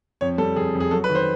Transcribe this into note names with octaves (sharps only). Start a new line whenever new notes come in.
F2 C#5
G3 A4
F2 G#4
F2
G#4
F#3 A4
B4
D#3
C5